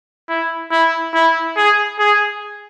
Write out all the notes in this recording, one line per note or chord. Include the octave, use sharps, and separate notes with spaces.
E4
E4
E4
G#4
G#4